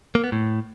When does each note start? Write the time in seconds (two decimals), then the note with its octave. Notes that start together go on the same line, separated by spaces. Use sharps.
0.15 A#3
0.24 B3
0.32 A2